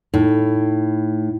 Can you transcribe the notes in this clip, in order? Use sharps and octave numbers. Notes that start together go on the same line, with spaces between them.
A2 D#4